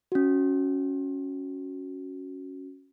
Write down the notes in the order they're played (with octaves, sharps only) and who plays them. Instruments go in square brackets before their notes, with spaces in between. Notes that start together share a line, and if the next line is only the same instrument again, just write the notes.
[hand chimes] C#4 F#4